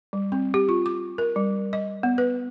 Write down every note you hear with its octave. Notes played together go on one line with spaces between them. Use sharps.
G3
C4
G4
F4
D6
A#4
G3
D#5
B3
B4